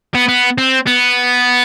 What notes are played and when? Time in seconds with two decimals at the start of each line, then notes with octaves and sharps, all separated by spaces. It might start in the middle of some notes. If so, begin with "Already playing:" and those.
0.15 B3
0.28 B3
0.58 C4
0.87 B3